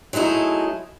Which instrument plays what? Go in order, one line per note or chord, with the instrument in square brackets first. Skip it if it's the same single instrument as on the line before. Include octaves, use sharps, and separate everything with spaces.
[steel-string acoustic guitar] F#3 G#3 A3 D#4 E4